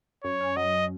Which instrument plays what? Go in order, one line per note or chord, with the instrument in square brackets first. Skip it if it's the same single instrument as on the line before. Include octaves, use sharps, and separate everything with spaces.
[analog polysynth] F#2 [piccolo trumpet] C#5
[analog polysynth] C#4
[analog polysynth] F#3 [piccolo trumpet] D#5